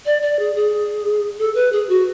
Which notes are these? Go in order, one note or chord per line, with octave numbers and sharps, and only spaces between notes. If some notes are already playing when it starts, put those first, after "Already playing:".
D5
D5
G#4
G#4
A4
B4
G#4
F#4